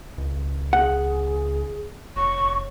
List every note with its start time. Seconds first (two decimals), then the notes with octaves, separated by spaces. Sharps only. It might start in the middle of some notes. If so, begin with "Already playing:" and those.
0.18 C#2
0.73 G#4 F#5
2.16 F1 C#5 C#6